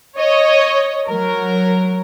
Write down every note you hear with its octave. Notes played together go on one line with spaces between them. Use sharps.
C#5 D#5
F#3 A#4